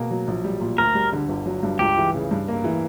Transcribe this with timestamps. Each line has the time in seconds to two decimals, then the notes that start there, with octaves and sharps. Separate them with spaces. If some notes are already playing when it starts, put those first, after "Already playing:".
Already playing: B2 A#3
0.11 F#3
0.28 A#1
0.44 G3
0.61 A#2
0.78 D2 A#4
0.95 G3
1.13 D3
1.29 G1
1.46 F#3
1.63 G2
1.79 C#2 G4
1.97 E3
2.14 C#3
2.31 G2
2.48 A#3
2.64 E3